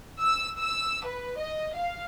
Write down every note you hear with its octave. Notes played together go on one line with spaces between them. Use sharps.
E6
E6
B4
D#5
F5